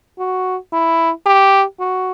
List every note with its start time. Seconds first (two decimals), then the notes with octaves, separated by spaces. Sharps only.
0.19 F#4
0.73 E4
1.26 G4
1.80 F#4